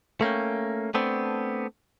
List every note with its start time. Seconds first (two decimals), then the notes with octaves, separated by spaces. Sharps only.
0.21 A3 A#3 C#4 G5
0.94 A3 B3 C4 D4